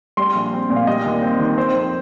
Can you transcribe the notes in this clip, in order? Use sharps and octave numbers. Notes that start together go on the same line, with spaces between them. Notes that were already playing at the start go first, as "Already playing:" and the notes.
G3 C6
A#1
C4
A#2
F5
G3 D#5
D#2
C4
D#3
C4 C5
F2